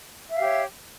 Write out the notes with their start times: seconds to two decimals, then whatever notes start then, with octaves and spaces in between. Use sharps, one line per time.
0.29 E5
0.34 F5
0.38 G4
0.43 C#5